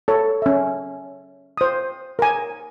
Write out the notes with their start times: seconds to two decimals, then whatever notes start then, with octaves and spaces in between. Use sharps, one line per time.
0.08 A4 C#5
0.42 C#4 E5
1.57 C5 D#6
2.19 A#4 G#5